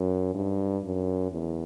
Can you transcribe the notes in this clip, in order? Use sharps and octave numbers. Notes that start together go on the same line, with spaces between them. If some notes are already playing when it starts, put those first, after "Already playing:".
Already playing: F#2
G2
F#2
E2